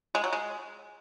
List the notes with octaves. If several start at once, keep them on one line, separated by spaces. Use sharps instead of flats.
G#3
F#3
G#3